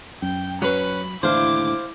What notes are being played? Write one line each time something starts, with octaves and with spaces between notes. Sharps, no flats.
F#2 G5
F#3 C#4 B4 B5
D#2 A2 D3 E3 E4 C5 F5 D6